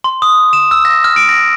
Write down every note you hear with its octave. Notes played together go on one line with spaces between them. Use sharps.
C6
D#6
E7
E6
A#6
F6
D7
A#6